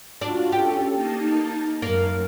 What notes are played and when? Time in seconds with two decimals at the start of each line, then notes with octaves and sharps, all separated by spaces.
0.21 D4 F4 F#4
0.52 C#4 G4 A4
0.94 A#3 D#4 A5
1.82 F#2 A#3 A#4